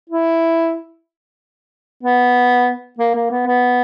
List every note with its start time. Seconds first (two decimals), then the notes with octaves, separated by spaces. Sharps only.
0.10 E4
2.03 B3
2.98 A#3
3.15 A#3
3.31 B3
3.47 B3